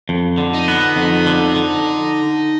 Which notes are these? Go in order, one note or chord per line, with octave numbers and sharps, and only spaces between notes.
F2
D3
D#4
B3
F2
D3
D3